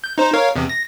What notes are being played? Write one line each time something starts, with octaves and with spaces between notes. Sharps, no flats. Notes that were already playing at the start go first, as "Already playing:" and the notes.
G6
D#4 C5
A#4 C#5 F5
E2 C3
A#6